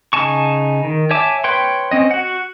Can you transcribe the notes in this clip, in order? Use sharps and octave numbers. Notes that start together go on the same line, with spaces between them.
C#3 D#4 G#5 A5 C#6
D#3
C#5 E5 G#5 A5 D6
B4 C#5 G5 C6
C4 C#4 D#5
F#4 F#5